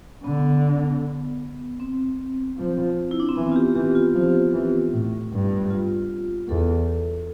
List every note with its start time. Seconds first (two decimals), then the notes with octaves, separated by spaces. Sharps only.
0.24 D3 B3
1.80 C4
2.58 F3
3.11 E4
3.20 D4
3.29 C4
3.36 E3 B3
3.52 F4
3.56 G4
3.75 E3 G4
3.95 F4
4.15 F3
4.54 E3
4.93 A2
5.32 G2
5.70 F4
6.48 E2 A4